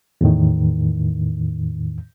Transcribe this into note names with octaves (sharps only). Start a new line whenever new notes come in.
E2 A2 D#3